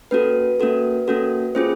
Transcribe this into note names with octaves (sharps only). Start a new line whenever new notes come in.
A#3 C#4 F#4 A4 B4
A#3 C#4 F#4 A4
A#3 C#4 F#4 A4
A#3 C#4 F4 G#4 C5